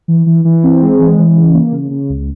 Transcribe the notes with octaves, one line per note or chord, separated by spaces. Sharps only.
E3
E3
E3
C4
G#3
E3
E3
C#3
A#3
C#3
C#3
C#2